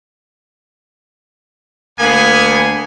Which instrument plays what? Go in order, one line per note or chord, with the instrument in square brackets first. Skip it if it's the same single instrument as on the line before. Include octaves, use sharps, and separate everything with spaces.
[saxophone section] D2 A#3 [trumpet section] B3 G#4 G#5